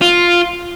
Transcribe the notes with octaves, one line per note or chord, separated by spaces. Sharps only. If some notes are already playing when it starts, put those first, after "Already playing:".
F4